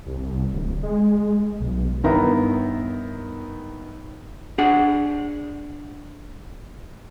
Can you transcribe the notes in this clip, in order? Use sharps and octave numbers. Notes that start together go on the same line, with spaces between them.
C2
D1
G#3
B1
G1 D#3 B3 E4 A#5
D4 G#4 F#5